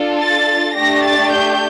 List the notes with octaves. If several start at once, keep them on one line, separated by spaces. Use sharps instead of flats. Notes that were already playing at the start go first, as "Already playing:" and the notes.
Already playing: D4 F4 A4
A6
A3 D4 G4 A#6
A6
G6